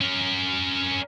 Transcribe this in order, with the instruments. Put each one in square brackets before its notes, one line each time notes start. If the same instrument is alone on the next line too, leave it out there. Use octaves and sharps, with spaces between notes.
[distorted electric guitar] C#4 A#4